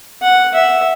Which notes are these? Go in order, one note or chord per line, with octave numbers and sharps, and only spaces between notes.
F#5
E5